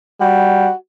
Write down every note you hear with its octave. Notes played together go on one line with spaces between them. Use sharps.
G3 F#4